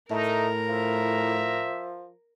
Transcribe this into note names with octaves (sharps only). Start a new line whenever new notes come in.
A2 A3 D#4 A#4 A#5
F3 E5